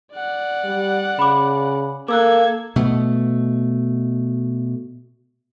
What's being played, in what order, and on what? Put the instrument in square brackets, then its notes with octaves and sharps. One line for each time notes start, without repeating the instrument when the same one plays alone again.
[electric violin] D5 F#5
[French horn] G3
[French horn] C#3 [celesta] B5 D6
[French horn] A#3 [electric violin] A4 G#6 [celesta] D6 E6 F#6
[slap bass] B2 A3